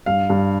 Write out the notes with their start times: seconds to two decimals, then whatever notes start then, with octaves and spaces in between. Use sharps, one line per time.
0.06 G2 F5
0.30 G2